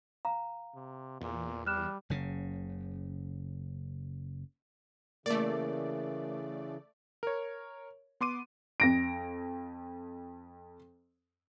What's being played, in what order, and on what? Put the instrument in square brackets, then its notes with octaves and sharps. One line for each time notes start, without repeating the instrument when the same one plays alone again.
[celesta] F5 [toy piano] A#5
[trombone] C3
[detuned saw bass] E2 [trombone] A#2
[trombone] G3 [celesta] F6 F#6 E7
[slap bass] F#1 C#3
[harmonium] C#3 E3 [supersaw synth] A3 D5 [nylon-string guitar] A#3
[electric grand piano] A#4 C#5
B3 C6 D6 D#7
[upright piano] F2 A#6 D7